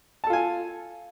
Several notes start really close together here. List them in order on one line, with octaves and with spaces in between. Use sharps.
A5 A4 F4 G#5